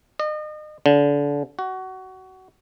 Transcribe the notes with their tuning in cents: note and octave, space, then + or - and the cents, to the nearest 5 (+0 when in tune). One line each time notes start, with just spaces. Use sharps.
D#5 -35
D3 -30
F#4 +20